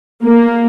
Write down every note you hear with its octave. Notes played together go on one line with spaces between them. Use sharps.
A#3